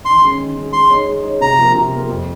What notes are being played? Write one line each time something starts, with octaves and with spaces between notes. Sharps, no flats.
D#3 C6
G#3 C#4
D#3
G#3 C#4
G#3 C6
D#4 G#4 C#5
G#3
D#4 G#4 C#5
C3 A#5
F3 A#3 F4 A#4
C3
F3 A#3 F4 A#4
F2